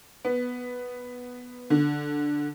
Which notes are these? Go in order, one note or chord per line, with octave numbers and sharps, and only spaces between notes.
B3
D3